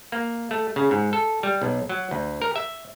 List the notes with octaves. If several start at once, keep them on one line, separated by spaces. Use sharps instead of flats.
A#3
A3
C#3
G#2
A4
G3
B1
F#3
D2
A#4
E5